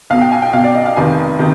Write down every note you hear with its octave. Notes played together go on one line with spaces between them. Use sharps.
B1 B2 F5
G5
G#5
G5
B1 B2 F5
D5
D#5
F5
F1 F2 C3 D#3 G#5
C3 D#3